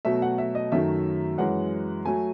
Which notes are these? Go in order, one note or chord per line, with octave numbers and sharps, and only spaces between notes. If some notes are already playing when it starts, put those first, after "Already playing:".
B2 F#3 A3 E5
F#5
E5
D#5
F#2 D#3 F#3 A3 E5
F#2 E3 G#3 F#5
F#3 A3 G#5